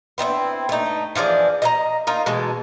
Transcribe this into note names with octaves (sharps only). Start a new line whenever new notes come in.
B3 C4 D#4 E4
A3 D#4
E3 F3 D4 G#4
D#5 E5 A#5
D#4 F4 A#4
B2 E3 G#3 A4